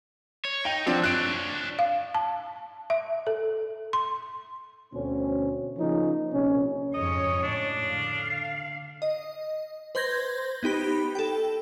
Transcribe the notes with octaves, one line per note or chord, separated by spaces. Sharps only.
C#5
D#4 G5
F3 F#3 C4 D4
D4 C#5 F#6 D7
F5
A5
E5
A4
C6
D2 B2 C4 C#4
C#3 F3 A#3 C#4 D#4
A#1 C3 C#4
F2 G#2 C#3 C#5 D#5
A2 D4
D3 F5
D#5
B4 C5 C6 G6 G#6 A#6
B3 D#4 G4 B5
A4 G5